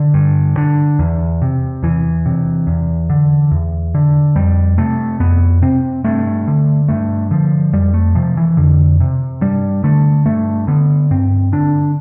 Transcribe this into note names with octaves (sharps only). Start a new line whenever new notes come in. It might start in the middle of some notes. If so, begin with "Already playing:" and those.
Already playing: D3
G2
D3
E2
C3
E2 E3
C3
E2
D3
E2
D3
F2 G3
C3 A3
F2 B3
C3 C4
G2 A3
D3
G2 A3
D3 F3
F2 G3
A3
C3 F3
E3
F2 D3
C3
G2 G3
D3 A3
G2 A3
D3 B3
G2 C4
D3 D4